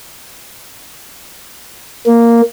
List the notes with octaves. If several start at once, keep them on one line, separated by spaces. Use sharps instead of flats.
A#3